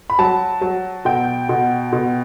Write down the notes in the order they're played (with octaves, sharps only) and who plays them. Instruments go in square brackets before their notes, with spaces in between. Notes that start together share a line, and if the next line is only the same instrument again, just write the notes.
[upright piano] B5
F#3 A5
F#3
B2 G5
B2
B2